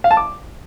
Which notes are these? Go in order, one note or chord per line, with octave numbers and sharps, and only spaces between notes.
F5
A5
D6